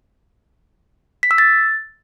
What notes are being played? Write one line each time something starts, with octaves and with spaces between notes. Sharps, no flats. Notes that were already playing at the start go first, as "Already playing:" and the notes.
B6
E6
A6